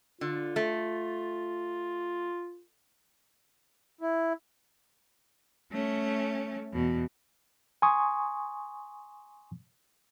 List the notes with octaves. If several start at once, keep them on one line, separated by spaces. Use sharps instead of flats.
D3 F4
A3
E4
A3 C#4
E2 B2
G#5 C6 C#6 D#6